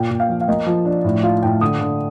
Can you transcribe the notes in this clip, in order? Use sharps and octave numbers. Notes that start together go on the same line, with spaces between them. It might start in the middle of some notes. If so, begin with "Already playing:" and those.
Already playing: A#2 G5
A#2
F5
F3
F5
A#3 D#5
F3
D4
A2
F4 F5
A2 G5
D3 D#6
D3